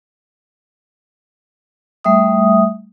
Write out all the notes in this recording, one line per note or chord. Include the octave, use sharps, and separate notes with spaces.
G3 A3 E5 D#6